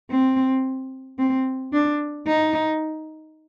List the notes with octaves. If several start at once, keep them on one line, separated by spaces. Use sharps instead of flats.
C4
C4
D4
D#4